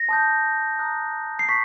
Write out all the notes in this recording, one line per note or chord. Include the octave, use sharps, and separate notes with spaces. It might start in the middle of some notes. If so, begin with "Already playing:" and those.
Already playing: A#6
A5 C6 D#6 G6
A#5 D#6 F#6
C7
C#6 B6